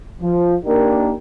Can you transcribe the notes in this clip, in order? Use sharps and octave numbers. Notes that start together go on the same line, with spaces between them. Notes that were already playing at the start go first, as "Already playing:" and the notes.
F3
A#3 D4 D#4 G4 A#4